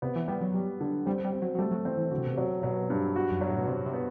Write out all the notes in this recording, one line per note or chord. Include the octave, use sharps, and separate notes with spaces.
C3 B3
E3
G3 B3
F#3
G3
D3
G3 C4
G3
C4
F#3
F#3
G3 A3
F#3
E3 C4
E3
D3 F#4
C3
B2
C3 F#3
B2 F#3
G2
F#4
F#2
G2 F#3
A2
B2
C3 F#3
C3
B3